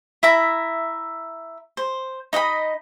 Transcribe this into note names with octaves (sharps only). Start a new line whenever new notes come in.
E4 E5 A#5
C5
D#4 D#5 F#5 B5